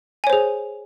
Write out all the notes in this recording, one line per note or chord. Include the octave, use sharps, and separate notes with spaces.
G#4 C5 C#5 G#5